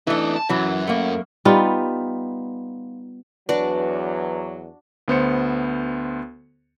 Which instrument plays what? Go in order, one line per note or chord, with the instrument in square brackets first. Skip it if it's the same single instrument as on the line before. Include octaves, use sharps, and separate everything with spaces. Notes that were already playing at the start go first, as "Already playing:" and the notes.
[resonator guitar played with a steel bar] E3 A3 [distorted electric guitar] D4 D#4
[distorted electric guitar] A5
[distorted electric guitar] F#2 [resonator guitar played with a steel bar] E3 F#3
[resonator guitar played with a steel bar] A3 A#3
[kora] G3 B3 D#4 F4
[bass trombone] E2 [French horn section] F#3 [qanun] D4 F#4 D5 [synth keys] B4
[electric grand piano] D2 B3 C5 C#7